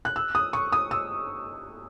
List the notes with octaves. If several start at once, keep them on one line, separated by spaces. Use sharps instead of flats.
F#6
E6
D#6
C#6
D#6
E6